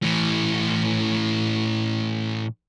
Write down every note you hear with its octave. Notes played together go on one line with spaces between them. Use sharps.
A2 E3